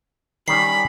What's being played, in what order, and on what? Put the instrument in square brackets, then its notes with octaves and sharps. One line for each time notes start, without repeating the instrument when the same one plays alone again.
[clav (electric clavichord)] D#3 G3 C#4 [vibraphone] D5 G5 G#5 [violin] B5 [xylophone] C7